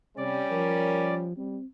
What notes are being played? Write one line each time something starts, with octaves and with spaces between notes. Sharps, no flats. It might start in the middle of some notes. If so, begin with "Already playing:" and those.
C3 G3 C#4 D5
F3 A#4
G3 C4